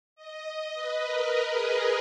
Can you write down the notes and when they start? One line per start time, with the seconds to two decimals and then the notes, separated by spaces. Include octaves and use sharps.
0.16 D#5
0.45 D#5
0.75 B4
1.04 A#4
1.49 G#4